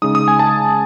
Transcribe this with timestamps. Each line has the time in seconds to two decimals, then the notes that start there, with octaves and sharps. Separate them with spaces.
0.02 C#3 G#3 D#4 D#6
0.15 D#6
0.28 G#5
0.39 A5